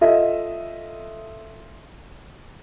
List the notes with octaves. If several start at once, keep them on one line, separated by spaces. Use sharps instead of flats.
F4 A4 D#5 E5